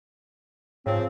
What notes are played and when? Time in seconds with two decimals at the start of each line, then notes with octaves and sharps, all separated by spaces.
0.86 G#2 C#3 F3 C4